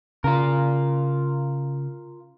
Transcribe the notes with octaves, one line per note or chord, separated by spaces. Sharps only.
C#3 F4 A#4